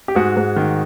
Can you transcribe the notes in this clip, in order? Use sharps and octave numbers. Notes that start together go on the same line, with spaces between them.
G4
G#2 F#4 G#4
G#2
D#3